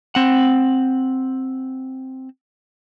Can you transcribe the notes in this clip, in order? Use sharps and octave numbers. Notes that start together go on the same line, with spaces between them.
C4 F#5